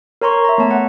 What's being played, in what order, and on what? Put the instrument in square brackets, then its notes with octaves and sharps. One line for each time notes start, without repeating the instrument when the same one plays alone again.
[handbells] A#4 C#5 A#5 C6 C#6
E5 A#5
A3 B3 C#5 A5
F#5